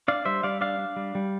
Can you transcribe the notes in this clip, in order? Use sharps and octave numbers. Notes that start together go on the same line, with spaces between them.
D4 D5 F5
G3 C5 E5
G3 D5 F5
D4 D5 F5
D4
G3
G3